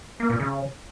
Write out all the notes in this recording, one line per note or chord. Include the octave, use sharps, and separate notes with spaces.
A#3
A#2
C#3